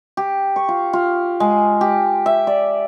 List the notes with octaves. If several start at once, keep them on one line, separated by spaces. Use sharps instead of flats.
G4
C#6
F4
F4
G#3
G4
E5
D5